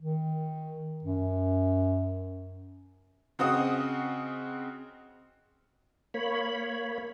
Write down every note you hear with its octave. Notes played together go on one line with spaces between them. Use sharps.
D#3
F#2
C#3 C4 F#4 D#5 F#5 D#6
A#3 C#5 B5